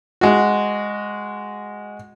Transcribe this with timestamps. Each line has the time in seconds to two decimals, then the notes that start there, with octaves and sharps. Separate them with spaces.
0.21 G#3 F#4